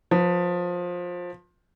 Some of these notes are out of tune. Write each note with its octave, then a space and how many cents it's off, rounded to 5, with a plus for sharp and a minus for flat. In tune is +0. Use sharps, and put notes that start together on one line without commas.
F3 +20 B4 +0